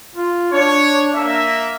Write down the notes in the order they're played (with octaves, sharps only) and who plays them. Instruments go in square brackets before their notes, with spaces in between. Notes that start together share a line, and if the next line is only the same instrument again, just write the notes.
[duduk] F4
[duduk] D4 [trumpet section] C#5
[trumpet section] A#3 E5